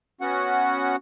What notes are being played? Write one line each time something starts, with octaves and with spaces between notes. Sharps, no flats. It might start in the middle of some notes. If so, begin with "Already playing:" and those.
B3 C#4 F#4 F#5